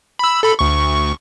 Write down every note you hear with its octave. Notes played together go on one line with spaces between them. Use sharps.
B5 E6
A4 B5
D2 C#6